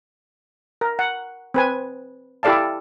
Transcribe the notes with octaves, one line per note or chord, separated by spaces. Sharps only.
A#4
F#5
C4 B4 G#5
E4 G4 A4 D5 F5 A5